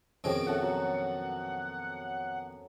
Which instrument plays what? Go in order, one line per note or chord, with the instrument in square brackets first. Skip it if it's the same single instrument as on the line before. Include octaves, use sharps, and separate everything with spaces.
[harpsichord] F2 B2 D#3 [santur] C#4 G#4 [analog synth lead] D7
[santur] C#4 A4 E5 [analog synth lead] F#5
[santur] F#3